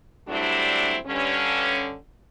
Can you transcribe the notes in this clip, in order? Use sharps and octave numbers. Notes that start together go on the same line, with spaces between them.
F#3 G3 A3 C4 D4 E4
G2 D3 C#4